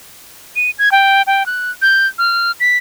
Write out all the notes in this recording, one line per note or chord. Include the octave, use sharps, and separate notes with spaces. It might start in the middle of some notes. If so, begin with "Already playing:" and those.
D#7
G#6
G5
G5
F#6
G6
F6
B6